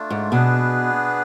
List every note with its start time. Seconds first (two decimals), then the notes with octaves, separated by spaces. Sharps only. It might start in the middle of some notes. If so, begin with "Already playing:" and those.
Already playing: A3 D4 F4
0.10 G#2
0.31 B2 B3 D4 G#4 B4